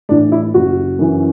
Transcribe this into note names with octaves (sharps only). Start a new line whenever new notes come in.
A2 E3 D4
E4
F#1 F#4
F#2 E3